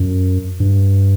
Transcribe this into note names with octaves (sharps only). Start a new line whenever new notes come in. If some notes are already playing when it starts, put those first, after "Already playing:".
Already playing: F#2
G2